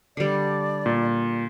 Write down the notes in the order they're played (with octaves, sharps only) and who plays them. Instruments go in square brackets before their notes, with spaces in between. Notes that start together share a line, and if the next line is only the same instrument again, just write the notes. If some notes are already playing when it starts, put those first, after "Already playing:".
[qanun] D3 G3 [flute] D5
[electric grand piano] A#2